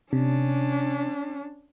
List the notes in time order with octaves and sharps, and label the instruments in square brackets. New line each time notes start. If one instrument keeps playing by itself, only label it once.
[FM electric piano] C3 [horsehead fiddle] C#4 D4